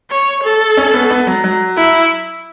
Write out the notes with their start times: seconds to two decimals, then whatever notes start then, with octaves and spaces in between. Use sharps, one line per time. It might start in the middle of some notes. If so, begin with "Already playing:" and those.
0.10 C#5
0.43 A4
0.77 C#4
0.94 B3
1.10 B3
1.27 F#3
1.44 F#3
1.77 E4